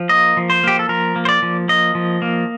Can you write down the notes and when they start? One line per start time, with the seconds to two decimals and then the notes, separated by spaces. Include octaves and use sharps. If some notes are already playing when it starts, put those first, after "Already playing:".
Already playing: F3
0.09 A#3 D#5
0.37 F3
0.50 C5
0.64 A#3 G4
0.79 A4
0.89 F3 A#4
1.16 A#3
1.25 C5
1.29 D5
1.43 F3
1.68 A#3 D#5
1.95 F3
2.22 A#3